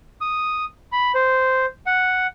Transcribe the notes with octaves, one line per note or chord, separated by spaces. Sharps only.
D#6
B5
C5
F#5